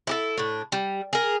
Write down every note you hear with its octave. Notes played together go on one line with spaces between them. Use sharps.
E4 G4 A4
A2 D4
G3
G#4 A#4